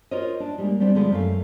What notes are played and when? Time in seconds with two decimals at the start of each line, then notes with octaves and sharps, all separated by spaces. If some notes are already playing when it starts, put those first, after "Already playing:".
0.11 F4 F#4 A#4 C5 C#5 D#5
0.40 D4
0.58 G3 G#3 A#3
0.80 G3 B3 C4 D4
0.95 D3 F3 G#3 F4 B4
1.11 F#2 A3 F5